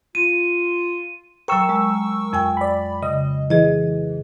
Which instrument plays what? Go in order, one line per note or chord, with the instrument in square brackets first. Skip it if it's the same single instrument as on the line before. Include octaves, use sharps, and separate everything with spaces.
[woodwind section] F4 [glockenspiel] D#7
[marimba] F#3 G5 [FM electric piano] A#4 C#6 E6
[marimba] G#3
F2 G5 G#5
[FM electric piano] D5 B5
[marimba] C#3 [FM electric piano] D#5
[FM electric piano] E3 [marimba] G#4 D#5